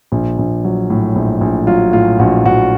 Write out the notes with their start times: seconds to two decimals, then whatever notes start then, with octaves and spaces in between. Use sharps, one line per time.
0.12 A#1
0.39 A#1
0.65 F#3
0.90 A2
1.16 A#1
1.41 A#1
1.67 F#3 F4
1.93 A2 F4
2.19 A#1 F#4
2.45 A#1 F#4